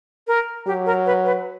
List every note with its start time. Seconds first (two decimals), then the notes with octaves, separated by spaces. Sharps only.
0.27 A#4
0.66 F#3 G4
0.86 A#4
1.06 B4
1.26 B4